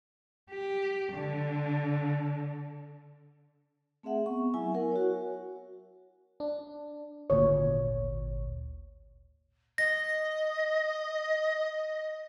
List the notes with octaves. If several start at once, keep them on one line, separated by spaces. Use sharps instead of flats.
G4
D3
A3 C4 G#4 E5 F#5
B3 C#6
F#3 E4 E5 G#5
A#4 F#5 G#5
F#4 C#5
D4
G#1 D2 A#2 C#5
D#5 A#6